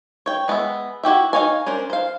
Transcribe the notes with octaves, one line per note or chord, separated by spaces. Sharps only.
C#5 G5
G#3 B3 C5 E5
E4 F#4 G4 E5
D#4 A4 C#5 F5 G#5
C#4 D4 A#4 C5
C5 F5